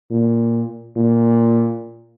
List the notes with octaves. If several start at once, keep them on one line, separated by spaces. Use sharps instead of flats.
A#2
A#2